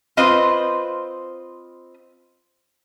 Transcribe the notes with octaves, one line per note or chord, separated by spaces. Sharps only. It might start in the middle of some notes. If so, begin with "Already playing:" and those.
C4 F4 B4 C5 D#5